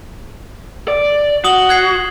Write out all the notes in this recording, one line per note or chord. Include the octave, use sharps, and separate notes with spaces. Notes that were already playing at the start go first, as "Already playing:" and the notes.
D5
F#4 D#6 F#7 G7
F#6 G#6 C7